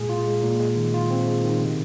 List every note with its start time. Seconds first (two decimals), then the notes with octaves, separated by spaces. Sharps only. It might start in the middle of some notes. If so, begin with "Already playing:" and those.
Already playing: A#2 G#3 G#4
0.09 F4
0.27 G#3
0.43 A#2
0.60 G#3
0.76 D#3
0.94 F4
1.11 C4
1.27 G#3
1.44 D#3
1.61 C3